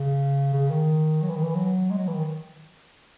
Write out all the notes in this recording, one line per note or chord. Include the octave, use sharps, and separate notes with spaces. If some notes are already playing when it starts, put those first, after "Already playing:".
Already playing: C#3
C#3
D#3
F#3
E3
D#3
E3
F#3
G#3
F#3
E3
D#3